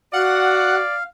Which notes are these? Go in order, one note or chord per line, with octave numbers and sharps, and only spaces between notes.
F#4 D5 F5 F#5